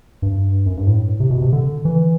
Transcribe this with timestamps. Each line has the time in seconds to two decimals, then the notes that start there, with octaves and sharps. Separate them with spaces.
0.22 G2
0.66 F#2
0.77 G2
0.87 A2
1.20 C3
1.30 B2
1.42 C3
1.52 D3
1.85 E3